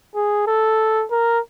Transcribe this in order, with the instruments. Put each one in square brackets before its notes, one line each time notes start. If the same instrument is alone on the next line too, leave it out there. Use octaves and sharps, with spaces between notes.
[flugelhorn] G#4
A4
A#4